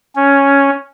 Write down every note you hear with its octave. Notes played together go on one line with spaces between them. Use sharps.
C#4